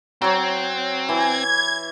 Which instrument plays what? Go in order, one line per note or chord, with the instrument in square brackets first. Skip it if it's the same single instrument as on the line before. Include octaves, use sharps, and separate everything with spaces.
[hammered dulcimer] F#3 C#5 [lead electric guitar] C4
[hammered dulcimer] E3 [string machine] G#6